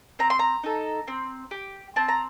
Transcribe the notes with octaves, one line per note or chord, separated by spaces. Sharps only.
C4 A#5
C6
A#5
D#4 A4
C4
G4
C4 A5
A#5